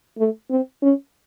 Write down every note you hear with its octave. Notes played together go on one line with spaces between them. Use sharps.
A3
C4
C#4